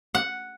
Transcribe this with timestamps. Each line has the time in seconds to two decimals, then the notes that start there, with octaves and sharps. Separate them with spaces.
0.15 F#5